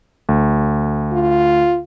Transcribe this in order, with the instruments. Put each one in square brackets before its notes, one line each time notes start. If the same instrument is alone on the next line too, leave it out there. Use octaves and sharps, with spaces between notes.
[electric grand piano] D2
[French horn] F4